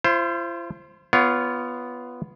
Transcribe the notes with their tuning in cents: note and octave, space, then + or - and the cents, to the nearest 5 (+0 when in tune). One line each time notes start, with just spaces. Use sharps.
F4 -45 C5 +10
B3 +0 F4 -10 C#5 +30